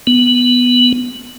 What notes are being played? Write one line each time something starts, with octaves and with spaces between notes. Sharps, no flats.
B3